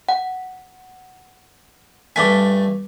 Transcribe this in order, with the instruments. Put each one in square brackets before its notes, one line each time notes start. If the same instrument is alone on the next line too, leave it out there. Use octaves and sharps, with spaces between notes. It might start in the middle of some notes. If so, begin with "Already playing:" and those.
[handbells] F#5
[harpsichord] G2 A3 G#5 [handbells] D6 B6